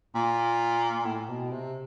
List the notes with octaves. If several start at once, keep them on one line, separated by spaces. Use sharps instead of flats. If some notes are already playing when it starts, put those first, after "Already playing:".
A#2
A2
B2
C3